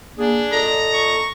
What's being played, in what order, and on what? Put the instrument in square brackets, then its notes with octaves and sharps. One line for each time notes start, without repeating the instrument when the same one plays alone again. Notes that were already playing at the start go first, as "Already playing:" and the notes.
[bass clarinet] A#3 [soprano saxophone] D4 [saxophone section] G#4
[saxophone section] A#2 D#5 [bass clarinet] A4 [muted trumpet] A#5
[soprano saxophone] C#6